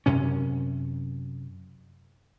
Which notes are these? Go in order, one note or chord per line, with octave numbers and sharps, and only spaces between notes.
F#2 C3 C#4